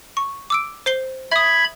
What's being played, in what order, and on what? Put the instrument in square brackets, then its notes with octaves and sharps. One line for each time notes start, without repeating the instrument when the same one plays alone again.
[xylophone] C#6
D6 E6 D7
C5 C7 G7
[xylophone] E5 D#6 [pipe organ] B5 G#6